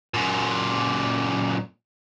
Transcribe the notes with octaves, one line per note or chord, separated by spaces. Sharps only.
F#2 A#2